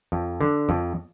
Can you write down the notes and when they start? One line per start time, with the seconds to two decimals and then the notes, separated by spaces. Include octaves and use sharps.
0.12 F2
0.41 D3
0.69 F2